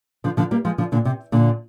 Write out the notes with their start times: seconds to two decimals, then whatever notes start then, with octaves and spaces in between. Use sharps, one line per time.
0.24 D3 F3
0.37 D3 F3
0.51 G3 A#3
0.65 F3 G#3
0.78 D3 F3
0.92 A#2 D3
1.05 C3
1.32 A#2 D3